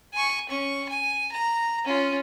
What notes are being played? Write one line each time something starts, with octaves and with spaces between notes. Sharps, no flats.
G#5 C#6
C#4 C#6
G#5
A#5
C#4 F4